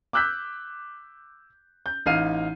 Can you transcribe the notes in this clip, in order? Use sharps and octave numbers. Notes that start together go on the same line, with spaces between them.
D6 E6 F#6 G6 B6
G6
A1 D#4 F5 F6 C7 D#7